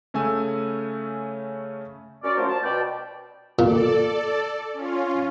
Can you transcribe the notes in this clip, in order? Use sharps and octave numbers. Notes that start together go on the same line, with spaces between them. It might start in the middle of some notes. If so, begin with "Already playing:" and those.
C#3 A3 C#4 G#5 E6
F#2 C#4 D5
F3 F#3 A3 C#4 A#4 C5
A5
B2 D5 G5
A#2 A4 D5
C#4 F4